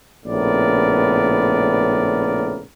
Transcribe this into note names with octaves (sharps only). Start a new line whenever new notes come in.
A#1 A2 C#3 B3 A#4 D5